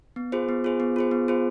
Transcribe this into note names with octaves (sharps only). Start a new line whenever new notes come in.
B3
F4 G#4 C5
B3
F4 G#4 C5
B3
F4 G#4 C5
B3
F4 G#4 C5